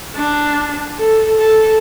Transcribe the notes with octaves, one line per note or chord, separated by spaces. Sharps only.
D4
A4
A4